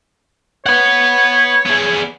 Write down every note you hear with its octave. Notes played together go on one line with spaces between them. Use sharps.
B4 C#5 F#5
B3 G#4